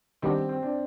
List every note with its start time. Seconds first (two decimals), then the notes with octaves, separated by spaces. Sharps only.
0.22 D#3 G3 B3 C4 D4
0.49 C4
0.62 D4